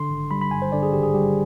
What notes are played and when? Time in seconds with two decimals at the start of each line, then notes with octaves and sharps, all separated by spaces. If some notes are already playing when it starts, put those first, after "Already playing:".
Already playing: D3 C6
0.10 G#1
0.31 G3 B5
0.42 B5
0.51 G2 G#5
0.62 C5
0.72 D3 D5
0.83 G#4
0.93 G#1 G4
1.03 G#4
1.14 G3 G4